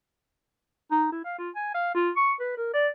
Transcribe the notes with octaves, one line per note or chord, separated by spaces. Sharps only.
D#4
E4
F5
F4
G#5
F5
F4
C#6
B4
A#4
D5